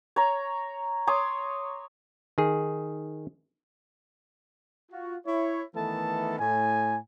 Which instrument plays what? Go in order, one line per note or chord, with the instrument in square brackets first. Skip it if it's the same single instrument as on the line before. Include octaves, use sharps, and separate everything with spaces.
[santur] C#5 A#5
C#5 C6 D6 D#6
[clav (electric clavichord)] D#3 G#4
[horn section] F4 F#4
E4 C#5
D#3 E3 A3 B3 A4 A5
A2 G#5